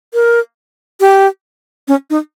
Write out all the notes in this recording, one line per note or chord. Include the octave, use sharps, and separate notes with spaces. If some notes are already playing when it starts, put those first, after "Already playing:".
A#4
G4
C#4
D#4